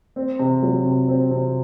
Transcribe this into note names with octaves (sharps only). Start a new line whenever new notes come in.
C4
C3
F#3
C3
C4
C3